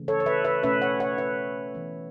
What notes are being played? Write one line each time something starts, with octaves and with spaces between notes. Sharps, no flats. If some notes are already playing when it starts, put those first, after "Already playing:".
Already playing: C#3 E3 A3
A4 C#5
C#5
B4 E5
B4 E5
B2 A3 C#4 B4 E5
C#5 F#5
C#5 F#5
B4 E5
E3 B3